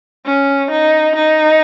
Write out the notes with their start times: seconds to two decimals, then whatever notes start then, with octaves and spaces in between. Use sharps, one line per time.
0.26 C#4
0.71 D#4
1.16 D#4